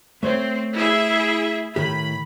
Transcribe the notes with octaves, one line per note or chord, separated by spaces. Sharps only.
A3 C4 C5 C#5
E4 G#4 E5
A2 D#3 G4 B5